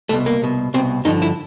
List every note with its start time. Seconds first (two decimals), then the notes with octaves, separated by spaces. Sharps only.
0.09 C2 B2 A3
0.26 A#3
0.42 C2 B2
0.74 C2 B2 C4
1.05 G2 D3 F3 D#4
1.22 E4